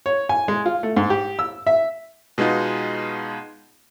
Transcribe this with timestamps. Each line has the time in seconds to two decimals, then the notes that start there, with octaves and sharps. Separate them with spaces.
0.06 C#5
0.29 G#5
0.48 G#3
0.66 F4
0.83 A3
0.96 G#2
1.10 G4
1.39 E6
1.67 E5
2.38 B2 G#3 B3 D#4 F4